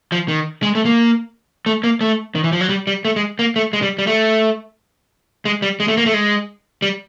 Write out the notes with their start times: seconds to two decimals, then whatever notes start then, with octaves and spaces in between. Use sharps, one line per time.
0.12 F3
0.28 D#3
0.63 G#3
0.75 A3
0.85 A#3
1.66 A3
1.84 A#3
2.01 A3
2.35 D#3
2.44 E3
2.53 F3
2.61 F#3
2.69 G3
2.87 G3
3.05 A3
3.16 G#3
3.39 A#3
3.56 A3
3.73 G#3
3.82 G3
3.99 G3
4.07 A3
5.45 G#3
5.62 G3
5.80 G#3
5.88 A3
5.97 A#3
6.06 A3
6.14 G#3
6.82 G3